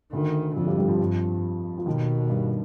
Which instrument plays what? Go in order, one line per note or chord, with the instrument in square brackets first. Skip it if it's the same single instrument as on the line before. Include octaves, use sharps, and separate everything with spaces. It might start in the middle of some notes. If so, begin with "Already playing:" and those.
[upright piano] D2 D3 [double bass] D#3
[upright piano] F2 F3 [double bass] D3
[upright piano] G2 G3
G2 G3
F2 F3
[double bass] G2
[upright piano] F3
[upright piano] D#2 D#3 [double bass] B2
[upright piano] G2